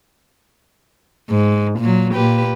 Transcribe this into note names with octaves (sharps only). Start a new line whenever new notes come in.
G#2
A#2 F#3
A#2 G4 B4